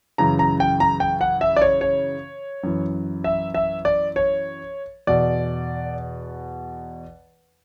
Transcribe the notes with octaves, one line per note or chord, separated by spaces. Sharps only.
F#2 C#3 E3 A#5
A#5
G5
A#5
G5
F#5
E5
D5
C#5
C#5
F#2 E3
E5
E5
D5
C#5
E2 B2 D5